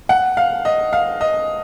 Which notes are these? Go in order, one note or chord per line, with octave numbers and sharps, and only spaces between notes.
F#5
F5
D#5
F5
D#5